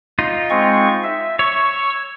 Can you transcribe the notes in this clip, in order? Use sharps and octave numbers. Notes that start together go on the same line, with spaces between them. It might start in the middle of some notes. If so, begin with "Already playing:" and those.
D#4 F4
G#3 C4 C#6
E5
C#5 C#6 E6